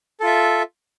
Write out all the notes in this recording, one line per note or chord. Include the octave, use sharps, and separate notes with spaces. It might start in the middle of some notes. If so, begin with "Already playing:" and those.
F4 A4 E5